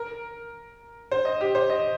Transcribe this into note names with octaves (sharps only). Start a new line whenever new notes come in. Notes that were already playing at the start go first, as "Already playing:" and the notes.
Already playing: A#4
C5
D#5
G4
C5
D#5